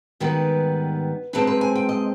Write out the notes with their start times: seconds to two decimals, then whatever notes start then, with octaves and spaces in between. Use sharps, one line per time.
0.20 G#2 D#3 G3 B3 B4
1.33 C3 F3 G#3 C4 B4
1.47 B4
1.61 G#5
1.75 G5
1.89 D#5